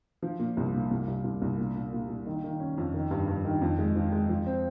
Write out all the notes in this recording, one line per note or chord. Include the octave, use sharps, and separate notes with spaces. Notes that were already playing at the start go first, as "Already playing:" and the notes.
F3
A#2
C2
A#2
C2
C2
C2
C2
A#2
A#2
A#2
A#2
D#3
D#3
C#4
F2
D#3
G2
G2
D#3
F2
G#3
F3
G#3
F3
C4